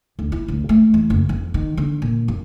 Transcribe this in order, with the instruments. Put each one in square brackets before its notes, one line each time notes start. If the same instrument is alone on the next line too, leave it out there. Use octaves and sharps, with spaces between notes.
[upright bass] D2
E4
D2
A3
E2
F#1
F2
D#3
D3
A#2
F#2